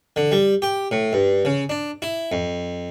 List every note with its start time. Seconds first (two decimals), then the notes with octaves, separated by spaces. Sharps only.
0.16 D3
0.32 G3
0.62 G4
0.91 A2
1.13 G2
1.45 C#3
1.69 D4
2.02 E4
2.32 F2